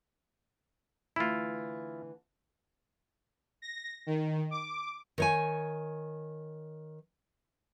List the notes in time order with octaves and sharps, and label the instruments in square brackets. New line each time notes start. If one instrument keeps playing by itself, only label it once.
[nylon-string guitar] D3 E3 A3 [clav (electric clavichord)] E4 F4
[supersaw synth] A#6
D#3
D6
[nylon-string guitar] D#3 C#5 G#5